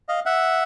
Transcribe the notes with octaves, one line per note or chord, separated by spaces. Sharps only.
D#5 F5
E5 F#5